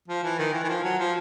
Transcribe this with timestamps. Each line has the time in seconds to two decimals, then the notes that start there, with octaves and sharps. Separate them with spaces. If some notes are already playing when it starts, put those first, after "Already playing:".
0.08 F3
0.23 E3
0.38 D#3
0.54 E3
0.64 E3
0.69 F3
0.84 F#3
0.99 F3